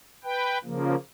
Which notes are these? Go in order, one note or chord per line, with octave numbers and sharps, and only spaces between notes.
B4 G5
C#3 F3 A#3